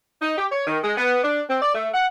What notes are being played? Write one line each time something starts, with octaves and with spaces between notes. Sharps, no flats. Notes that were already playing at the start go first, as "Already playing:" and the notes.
D#4
G4
C#5
D#3
G#3
B3
D4
C4
D5
A3
F#5